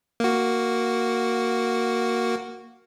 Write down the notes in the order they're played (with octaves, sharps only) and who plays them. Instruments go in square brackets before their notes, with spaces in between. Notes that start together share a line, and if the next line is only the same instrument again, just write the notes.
[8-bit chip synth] A#3 F#4